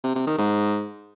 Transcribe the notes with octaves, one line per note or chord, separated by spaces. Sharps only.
C3
C3
D#3
G#2